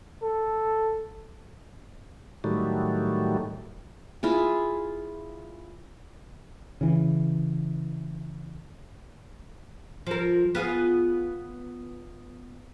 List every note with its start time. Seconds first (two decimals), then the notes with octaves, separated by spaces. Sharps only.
0.22 A4
2.44 A2 D#3 F#3 G3 A3
4.23 E4 F4 G#4
6.81 C#3 E3
10.07 F3 A#4
10.55 B3 F4 G#4